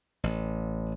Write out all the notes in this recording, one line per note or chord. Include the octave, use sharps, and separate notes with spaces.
A1